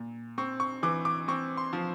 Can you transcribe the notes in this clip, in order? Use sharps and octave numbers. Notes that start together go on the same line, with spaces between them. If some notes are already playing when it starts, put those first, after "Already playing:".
Already playing: A#2
C4 C#6
C#6
E3 D6
D6
C4 C#6
C6
F3